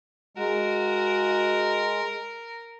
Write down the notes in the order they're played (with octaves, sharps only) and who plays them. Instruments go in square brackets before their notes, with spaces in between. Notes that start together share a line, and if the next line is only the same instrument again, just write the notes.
[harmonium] G#3 [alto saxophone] F#4 [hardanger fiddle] A#4